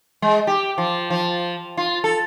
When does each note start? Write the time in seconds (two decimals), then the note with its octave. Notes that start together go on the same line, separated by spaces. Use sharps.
0.22 G#3
0.47 G4
0.78 F3
1.10 F3
1.77 F4
2.04 A4